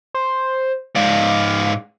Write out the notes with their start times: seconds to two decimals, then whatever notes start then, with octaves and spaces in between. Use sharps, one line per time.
0.14 C5
0.96 G#2 D5 F5